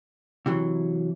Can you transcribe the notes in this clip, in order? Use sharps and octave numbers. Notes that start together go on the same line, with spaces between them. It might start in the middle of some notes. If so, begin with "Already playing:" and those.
C3 E3 F#3